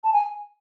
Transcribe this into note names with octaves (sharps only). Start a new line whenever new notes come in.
A5
G#5